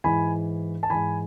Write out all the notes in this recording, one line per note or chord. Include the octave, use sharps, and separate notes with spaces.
G#2 E3 G#5 B5
A5
G#2 E3 G#5 B5